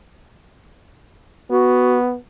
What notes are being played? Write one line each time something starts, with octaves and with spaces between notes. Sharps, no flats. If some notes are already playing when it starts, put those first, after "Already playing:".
B3 F#4